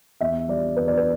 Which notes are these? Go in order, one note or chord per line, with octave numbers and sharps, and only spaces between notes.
E2 E5
G3 D5
E2 B4
D5
B4